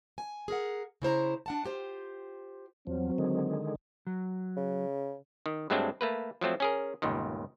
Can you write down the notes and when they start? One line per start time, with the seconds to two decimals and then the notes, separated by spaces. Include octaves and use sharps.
0.18 G#5
0.48 G#4 A#4 F#5
1.02 C#3 E4 C5 A#5
1.46 D4 F#5 A5
1.65 F4 G4 C5
2.87 E2 F3 F#3 C4
3.18 D3 D#3 G#3
4.07 F#3
4.57 C#3
5.46 D#3
5.70 G2 F#3 G#3 A3 C4 D4
6.01 A3 A#3 B4
6.41 F3 F#3 A3 C4
6.60 C#4 G#4 A#4
7.02 G1 C#2 A#2 D#3